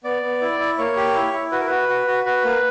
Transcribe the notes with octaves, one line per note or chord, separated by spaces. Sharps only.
B3 D5
B3
E4
E4
A#3 C#5
G4
E4
E4
F#4 B4
A#4
F#4 B4
F#4
F#4
F#4 B4
A#3